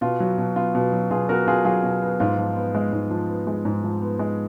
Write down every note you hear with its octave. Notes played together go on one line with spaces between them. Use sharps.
B2 F4
F#3
B2
B3 F4
B2
F#3
B2 F4 G#4
B3 F#4 A#4
B2 F4 G#4
F#3 F4 G#4
B2
B3
G#2 F4
F3
B3
G#3
G#2
F3
B3
G#3
G#2
F3
B3
G#3